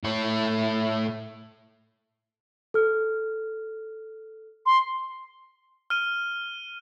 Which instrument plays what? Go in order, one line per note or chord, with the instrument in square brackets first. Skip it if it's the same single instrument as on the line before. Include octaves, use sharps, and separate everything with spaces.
[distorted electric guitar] A2 C#5
[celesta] A4 F6
[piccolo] C6
[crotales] F6 D#7